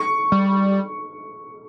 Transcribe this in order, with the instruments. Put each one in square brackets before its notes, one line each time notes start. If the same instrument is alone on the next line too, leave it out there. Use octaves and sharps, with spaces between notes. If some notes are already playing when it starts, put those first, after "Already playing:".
Already playing: [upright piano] C#6
[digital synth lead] G3